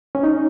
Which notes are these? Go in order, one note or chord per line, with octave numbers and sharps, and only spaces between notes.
C#4
D#4